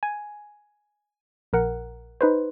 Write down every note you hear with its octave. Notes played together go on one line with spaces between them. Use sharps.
G#5
A#1 A#4 F#5
D#4 B4 C5